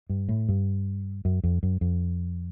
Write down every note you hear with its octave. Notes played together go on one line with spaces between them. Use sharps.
G2
A2
G2
F#2
F2
F#2
F2